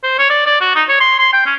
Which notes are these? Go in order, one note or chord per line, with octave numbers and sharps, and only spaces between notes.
C5
C#5
D5
D5
F#4
D#4
C#5
C6
C6
G5
C#4